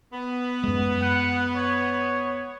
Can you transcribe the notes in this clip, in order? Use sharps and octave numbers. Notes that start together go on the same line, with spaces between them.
B3
F#2 G#3
F#5
C#5